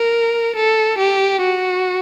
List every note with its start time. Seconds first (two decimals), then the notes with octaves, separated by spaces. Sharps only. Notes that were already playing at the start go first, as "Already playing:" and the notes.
Already playing: A#4
0.56 A4
0.99 G4
1.42 F#4